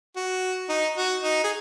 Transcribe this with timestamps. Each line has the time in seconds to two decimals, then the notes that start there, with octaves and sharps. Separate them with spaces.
0.16 F#4
0.69 D#4
0.97 F#4
1.23 D#4
1.44 G#4